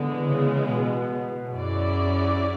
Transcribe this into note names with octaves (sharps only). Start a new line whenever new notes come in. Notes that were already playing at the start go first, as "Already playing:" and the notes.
Already playing: D3 E3 G#3 B3
C#3
B2
F#2 F#3 C#4 E4 G#4 D5